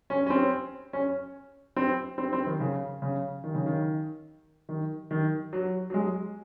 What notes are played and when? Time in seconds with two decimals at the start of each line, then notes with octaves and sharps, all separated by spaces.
0.10 C#4
0.27 C#4
0.30 C4
0.93 C#4
1.76 C4
2.18 C4
2.33 C4
2.47 D#3
2.60 C#3
3.02 C#3
3.44 D#3
3.54 C#3
3.66 D#3
4.69 D#3
5.11 D#3
5.53 F#3
5.90 F#3
5.94 G#3